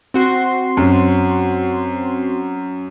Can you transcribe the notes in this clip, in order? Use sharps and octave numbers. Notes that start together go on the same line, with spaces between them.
C4 F#4 C6
F#2